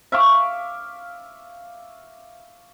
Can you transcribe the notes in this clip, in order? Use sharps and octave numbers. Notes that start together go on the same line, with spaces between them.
E5 F5 C#6 D6